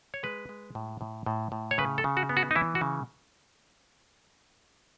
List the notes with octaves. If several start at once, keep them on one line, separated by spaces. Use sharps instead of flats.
C#5
G#3 B4
G#3
A2
A2
A2
A2
C#5
C#3 B4
A4
C#3
F#4
B3
F#4
D#4
E3 E4
F#4
C#3